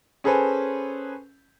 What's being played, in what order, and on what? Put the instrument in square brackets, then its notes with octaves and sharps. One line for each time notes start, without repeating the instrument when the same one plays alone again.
[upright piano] C#4 G#4 A4 B4 C5